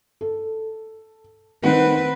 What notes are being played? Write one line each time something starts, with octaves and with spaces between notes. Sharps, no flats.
A4
D#3 C4 B4 F#5